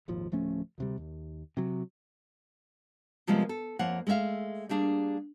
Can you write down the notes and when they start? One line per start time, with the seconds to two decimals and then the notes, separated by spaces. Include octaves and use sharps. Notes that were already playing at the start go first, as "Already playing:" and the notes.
0.08 D#1 G#1 D#2 F3
0.32 D1 F3 A3 C#4
0.78 D2 C3 G3
0.98 D#2
1.57 C3 F#3
3.27 C3 F3 G3 G#3 A#3 B3
3.49 A4
3.79 F2 F3 A#3 C#5 F#5
4.07 G#3 A3 B3 E5 F5
4.69 G3 A#3 D4 G#4